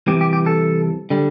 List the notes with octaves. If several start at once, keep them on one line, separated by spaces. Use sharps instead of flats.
C2 C3 E3 G4
G4
G4
A4
D3 G3